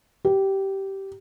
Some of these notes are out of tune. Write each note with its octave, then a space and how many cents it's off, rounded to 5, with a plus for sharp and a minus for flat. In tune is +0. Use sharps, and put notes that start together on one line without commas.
G4 -15